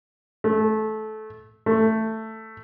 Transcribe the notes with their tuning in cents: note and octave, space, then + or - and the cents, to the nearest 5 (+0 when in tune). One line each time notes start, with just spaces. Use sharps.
A3 -20
A3 +10